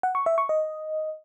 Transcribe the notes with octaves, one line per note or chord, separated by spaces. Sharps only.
F#5
C#6
E5
C#6
D#5